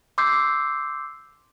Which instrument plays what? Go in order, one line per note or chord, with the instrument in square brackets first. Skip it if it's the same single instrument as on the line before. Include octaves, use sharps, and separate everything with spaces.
[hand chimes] C6 D6 E6 G6 C7